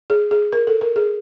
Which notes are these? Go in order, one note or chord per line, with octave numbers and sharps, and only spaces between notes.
G#4
G#4
A#4
A4
A#4
G#4